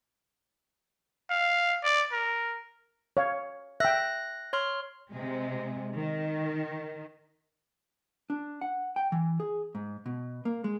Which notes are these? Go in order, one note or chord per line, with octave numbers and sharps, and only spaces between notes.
F5
D5
A#4
C#5 F5
E5 G5 F#6 A#6
C#5 C6 F6
C3 G#3
D#3
D4
F#5
G5
E3
G#4
G#2
B2
A#3
G#3